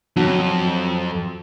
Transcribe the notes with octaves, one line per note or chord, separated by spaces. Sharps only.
F2 F#3